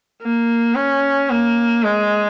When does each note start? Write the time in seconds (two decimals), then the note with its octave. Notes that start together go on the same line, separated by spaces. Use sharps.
0.23 A#3
0.75 C#4
1.30 A#3
1.84 G#3